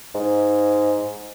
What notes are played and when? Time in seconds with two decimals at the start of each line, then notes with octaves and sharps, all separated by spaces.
0.15 G#2